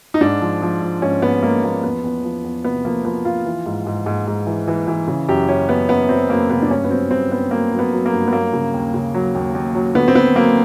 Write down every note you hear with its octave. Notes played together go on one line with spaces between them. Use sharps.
D#4
G#2 D4
F3
F3
F3
G#2 C#4
G#2 B3
G#2 A#3
F3 A#3
E2 B3
E2
F3
E2
C3 B3
F3 A#3
F3 B3
F3 F4
E3
G#2
G#2
G#2
G#2
E3
E3
E3
C#3
F#2 G4
F#2 C#4
F#2 B3
F#2 B3
F#2 C4
F#2 A#3
C#3 B3
D4
G2 C#4
B3
F#3 C4
G2 C4
G2 B3
F#3 A#3
F#3
B3
F#3
A#3
G2
B3
F#3 A#3
C#3
D#2
C#3
F#3
D#2
D#2
F#3
D3 B3
C4
D3 B3
F#3 A#3